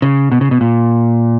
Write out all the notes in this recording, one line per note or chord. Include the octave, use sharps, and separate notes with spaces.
C#3
B2
C#3
B2
A#2